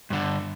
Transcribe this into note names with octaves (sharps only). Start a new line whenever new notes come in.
G2 D3